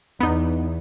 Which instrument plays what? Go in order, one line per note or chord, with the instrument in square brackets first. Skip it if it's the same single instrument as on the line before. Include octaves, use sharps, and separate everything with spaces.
[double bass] E2 [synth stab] B3 D#4